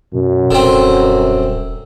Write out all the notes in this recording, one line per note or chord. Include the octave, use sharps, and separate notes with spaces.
F#2 B2
D#1 D3 C4